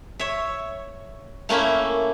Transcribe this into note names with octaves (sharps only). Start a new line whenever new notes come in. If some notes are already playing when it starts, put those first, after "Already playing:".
C#5 E5
A3 A#3 C#4 E4